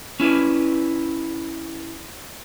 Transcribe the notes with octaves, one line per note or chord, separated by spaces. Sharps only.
C#4 E4 B4 D5